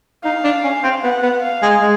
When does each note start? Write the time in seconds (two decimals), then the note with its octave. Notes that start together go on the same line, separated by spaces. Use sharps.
0.24 D#4 F5
0.44 D4
0.63 C#4
0.83 C4
1.03 B3 F#5
1.23 B3
1.43 F5
1.62 G#3
1.81 G#3